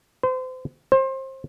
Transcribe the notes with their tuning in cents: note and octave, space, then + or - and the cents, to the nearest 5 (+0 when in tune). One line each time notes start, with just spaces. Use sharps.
C5 -35
C5 +25